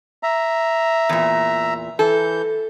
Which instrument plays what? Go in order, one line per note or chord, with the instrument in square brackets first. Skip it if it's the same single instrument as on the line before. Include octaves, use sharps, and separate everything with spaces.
[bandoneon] E5 A#5
[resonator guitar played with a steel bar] E2 A#2
[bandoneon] E3 G6 [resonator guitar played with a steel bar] A4